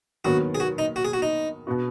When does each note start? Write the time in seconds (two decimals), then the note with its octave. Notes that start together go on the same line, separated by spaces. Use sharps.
0.25 D#2 D#3 F#3 B3 F#4
0.55 G#4
0.60 F#4
0.78 D#4
0.96 F#4
1.05 G#4
1.13 F#4
1.22 D#4
1.67 B2 B3 F#4